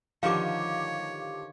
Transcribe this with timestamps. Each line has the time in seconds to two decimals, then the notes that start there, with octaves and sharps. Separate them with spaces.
0.23 D3 D#3 F3 D#4 G4 C#5 F5 D6